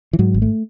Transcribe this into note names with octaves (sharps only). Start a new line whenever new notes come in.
E3
G#2 F#3
G#1
A3